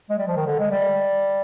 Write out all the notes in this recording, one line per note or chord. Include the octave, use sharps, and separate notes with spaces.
G#3
G3
F3
D#3
D3
G#3
G3